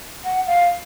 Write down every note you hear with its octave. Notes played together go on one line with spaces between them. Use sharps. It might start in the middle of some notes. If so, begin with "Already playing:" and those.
F#5
F5